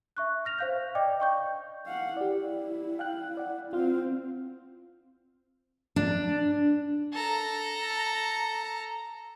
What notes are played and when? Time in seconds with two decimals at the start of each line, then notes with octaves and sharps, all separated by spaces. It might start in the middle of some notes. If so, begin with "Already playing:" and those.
0.17 E5 C#6 F#6
0.45 F6 A#6 F7
0.59 C5 F5 G6
0.95 D5 D#5 G5 D6
1.20 G5 C#6 G6
1.87 F5 F#5
2.17 E4 G4 D5
2.99 F5 G5 F#6
3.37 D5 F#5
3.73 C4 F4 F6
5.96 D4
7.13 A4 A#5